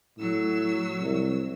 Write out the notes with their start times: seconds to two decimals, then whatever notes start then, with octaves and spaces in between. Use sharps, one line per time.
0.18 A2 F#3 E6
1.00 C2